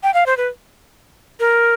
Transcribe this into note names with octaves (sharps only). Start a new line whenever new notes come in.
G5
F5
C5
B4
A#4